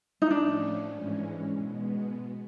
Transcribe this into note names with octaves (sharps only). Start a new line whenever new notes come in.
D#4
A2 F3 A3 C#4 D4
G#2 E3 G#3 C#4
B2 G#3 B3